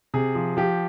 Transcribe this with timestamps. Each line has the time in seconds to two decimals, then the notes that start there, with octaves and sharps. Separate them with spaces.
0.14 C3 G#4
0.35 F3
0.57 F3 G4